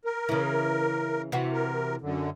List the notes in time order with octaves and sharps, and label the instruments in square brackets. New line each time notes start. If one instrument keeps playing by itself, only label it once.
[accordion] A#4
[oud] C#3 E3
C3 E3 F#4
[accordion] A#4
F#2 D3